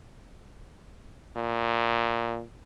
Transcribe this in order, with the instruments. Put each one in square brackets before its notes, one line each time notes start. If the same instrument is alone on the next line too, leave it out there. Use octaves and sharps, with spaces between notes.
[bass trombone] A#2